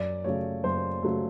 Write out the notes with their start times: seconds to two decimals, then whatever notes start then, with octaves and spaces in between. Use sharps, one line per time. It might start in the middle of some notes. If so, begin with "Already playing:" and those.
Already playing: F#2 D5
0.24 C#3 F#3 A3 C#5
0.64 F#2 C5
1.02 C#3 F#3 A3